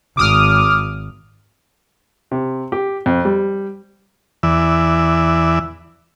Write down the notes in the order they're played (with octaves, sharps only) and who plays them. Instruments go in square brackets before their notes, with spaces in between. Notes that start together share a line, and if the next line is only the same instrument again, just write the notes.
[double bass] G#1 [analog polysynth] D6 D#6 F6
[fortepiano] C3
G4
F2
G3
[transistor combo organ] E2 E3 D5 E5